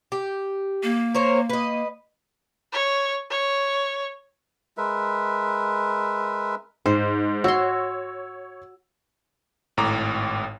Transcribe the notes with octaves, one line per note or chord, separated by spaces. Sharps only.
G4
A#3
A#4 C5 C#5
B4 D#5
C#5
C#5
G#3 A#4 B4 E5
G#2 C5
F#4 C#5 C6 E6
G#1 A2 A#5 D6